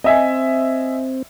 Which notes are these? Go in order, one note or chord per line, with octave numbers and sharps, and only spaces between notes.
C4 D#5 E5 G#5